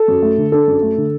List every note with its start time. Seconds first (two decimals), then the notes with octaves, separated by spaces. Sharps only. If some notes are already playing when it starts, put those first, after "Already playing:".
Already playing: A4
0.08 F#2
0.22 A3
0.37 D3
0.52 D4 A4
0.67 F#2
0.82 A3
0.97 D3